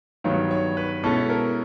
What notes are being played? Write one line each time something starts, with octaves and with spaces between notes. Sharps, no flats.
G2 D#3 F#3 B3 C#5
C#5
B4
B2 G#3 C#4 E4 A4
A#4